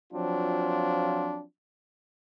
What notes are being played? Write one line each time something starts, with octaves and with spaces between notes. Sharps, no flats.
F3 F#3 C4 D4 F4